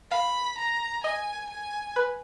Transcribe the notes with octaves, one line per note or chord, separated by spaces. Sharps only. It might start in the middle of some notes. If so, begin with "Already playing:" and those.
F5 B5
A#5
D#5 G#5
G#5
B4